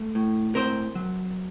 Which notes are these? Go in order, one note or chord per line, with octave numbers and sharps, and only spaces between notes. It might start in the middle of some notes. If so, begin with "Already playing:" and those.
Already playing: A3
A2
C4 A#4 C5
F#3